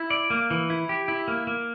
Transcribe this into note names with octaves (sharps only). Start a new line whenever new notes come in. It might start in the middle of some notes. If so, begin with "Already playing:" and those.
Already playing: E4
D5
A#3
E3
E4
G4
E4
A#3
A#3